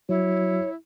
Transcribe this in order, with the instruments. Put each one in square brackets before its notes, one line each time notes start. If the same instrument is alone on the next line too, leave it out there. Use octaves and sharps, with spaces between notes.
[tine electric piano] F#3 F#4 [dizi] E4 [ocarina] C#5